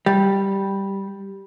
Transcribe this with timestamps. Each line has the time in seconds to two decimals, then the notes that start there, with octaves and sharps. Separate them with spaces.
0.06 G3